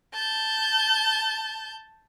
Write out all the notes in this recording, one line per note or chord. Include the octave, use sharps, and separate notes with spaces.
A5 G6